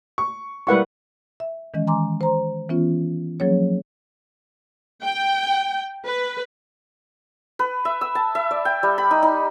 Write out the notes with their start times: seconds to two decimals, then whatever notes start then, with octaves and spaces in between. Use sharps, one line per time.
0.18 C#6
0.67 G3 A#3 E4 B4 F#5 C#6
1.40 E5
1.74 D#3 E3 G#3 C#4 D#5
1.87 G#5 A#5 C6 D6
2.21 C5 A#5 C6
2.69 E3 B3 C#4 F4
3.40 F3 F#3 A#3 C#4 G#4 C#5
5.03 G5
6.05 B4
7.59 B4
7.85 E5
8.01 E6
8.15 A5
8.35 E5
8.51 D5
8.65 G5
8.83 G3
8.98 B5
9.11 D#4
9.23 D#4